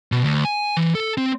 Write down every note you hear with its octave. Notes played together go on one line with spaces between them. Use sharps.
B2
D2
G#5
E3
A4
C4